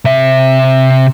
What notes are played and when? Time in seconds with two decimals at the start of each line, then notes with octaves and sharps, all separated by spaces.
0.05 C3 E5